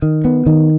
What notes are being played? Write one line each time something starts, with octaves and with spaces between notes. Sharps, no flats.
D#3
B3
D#3